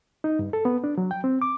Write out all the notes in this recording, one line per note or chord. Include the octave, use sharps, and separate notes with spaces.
D#4
G2
A4
B3
D4
F#3
G5
C4
D6